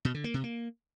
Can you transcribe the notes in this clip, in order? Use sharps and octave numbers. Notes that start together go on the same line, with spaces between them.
B2
D3
A#3
C3
A#3